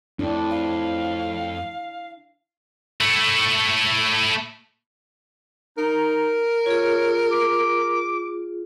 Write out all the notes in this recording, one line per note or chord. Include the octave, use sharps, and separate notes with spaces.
F2 A2 D4 E4
F5
A3 E4
D#4 A#4
F4 G#4 C#5
D6